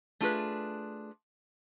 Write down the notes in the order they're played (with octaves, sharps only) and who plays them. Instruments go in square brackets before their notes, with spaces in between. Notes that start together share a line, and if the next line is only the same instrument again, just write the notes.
[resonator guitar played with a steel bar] A3 D4 F4 G#4 A4 B4